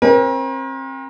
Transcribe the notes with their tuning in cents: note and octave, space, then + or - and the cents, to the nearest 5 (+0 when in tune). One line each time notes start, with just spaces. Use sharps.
C4 +35 A#4 +40